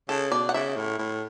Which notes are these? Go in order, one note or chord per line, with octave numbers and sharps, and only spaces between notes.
C#3 A4
B2 D5
F#5
C#3 E5
A2
A2